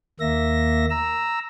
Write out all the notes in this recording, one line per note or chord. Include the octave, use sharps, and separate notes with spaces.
D#2 A#3 E5 A#6
A#5 E6